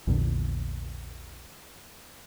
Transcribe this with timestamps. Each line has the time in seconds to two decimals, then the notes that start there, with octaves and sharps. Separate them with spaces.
0.07 A#1 E2 A#2 D3